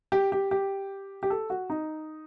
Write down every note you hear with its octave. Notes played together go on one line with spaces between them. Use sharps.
G4
G4
G4
G4
A4
F#4
D#4